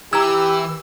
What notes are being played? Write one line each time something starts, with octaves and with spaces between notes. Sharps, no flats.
E3 G4 A#5 E6 G#6